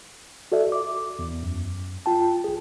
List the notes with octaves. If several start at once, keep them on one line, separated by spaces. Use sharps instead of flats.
F#4 A4 D5 E5
D6
E2
F#2
F4 G5 A5
A1 G#4